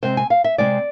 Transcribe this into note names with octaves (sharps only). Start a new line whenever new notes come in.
C3 G#3 C4 C5
G#5
F5
E5
C3 G#3 C4 D5